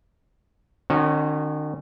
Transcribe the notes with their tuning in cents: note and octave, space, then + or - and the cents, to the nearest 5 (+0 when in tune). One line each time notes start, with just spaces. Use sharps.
D#3 -45 C#4 -25 F#4 -5